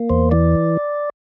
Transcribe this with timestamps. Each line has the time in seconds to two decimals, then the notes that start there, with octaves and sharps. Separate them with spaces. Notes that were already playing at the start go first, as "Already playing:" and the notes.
Already playing: A#3
0.10 E2 C5
0.31 E3 D5